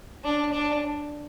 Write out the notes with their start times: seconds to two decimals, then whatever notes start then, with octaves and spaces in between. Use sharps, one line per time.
0.24 D4
0.52 D4